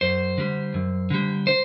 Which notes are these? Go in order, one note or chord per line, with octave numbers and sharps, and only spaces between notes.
F#2 C5
D3 G3
F#2
D3 G3
C5